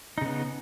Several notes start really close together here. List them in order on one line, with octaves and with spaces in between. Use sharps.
D#4 C#3 B3